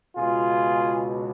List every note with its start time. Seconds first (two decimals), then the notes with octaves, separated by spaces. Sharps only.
0.16 C#2 B2 F4 G#4